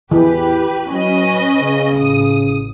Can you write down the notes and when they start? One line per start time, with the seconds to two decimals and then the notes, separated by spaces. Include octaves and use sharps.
0.11 E2 E3 G4 B4
0.92 F#3 C#4 B4 D#5
1.61 C#3
1.95 A1 D#6